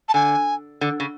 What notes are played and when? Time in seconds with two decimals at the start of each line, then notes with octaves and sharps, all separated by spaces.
0.09 A5
0.14 D3 G#5
0.81 D3
1.00 C#3